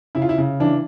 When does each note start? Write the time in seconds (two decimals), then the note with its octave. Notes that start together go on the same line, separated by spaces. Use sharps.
0.15 C#3 E4
0.22 F4
0.29 E4
0.38 C#3
0.60 E3 D4